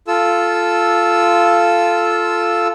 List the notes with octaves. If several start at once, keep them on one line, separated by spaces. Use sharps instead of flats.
F4 A4 E6